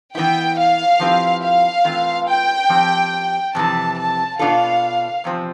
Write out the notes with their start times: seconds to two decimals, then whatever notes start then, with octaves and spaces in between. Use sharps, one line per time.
0.15 E3 B3 E4 G5
0.58 F5
1.00 F3 C4 E4 G4 B4
1.42 F5
1.84 E3 A3 C4 F4 B4
2.28 G5
2.69 F3 C4 G4
3.55 F2 C3 E3 A5
3.97 A5
4.39 B2 B3 D4 F4 A4 F5
5.24 E2 C3 F3 C4